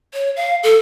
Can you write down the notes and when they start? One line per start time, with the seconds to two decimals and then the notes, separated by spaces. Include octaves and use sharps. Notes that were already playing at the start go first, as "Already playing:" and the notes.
0.13 C#5
0.36 F5
0.63 A4